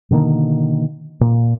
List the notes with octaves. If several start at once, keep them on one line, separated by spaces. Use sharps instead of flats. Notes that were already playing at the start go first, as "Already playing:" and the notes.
B2 D3 D#3 A#3
A#2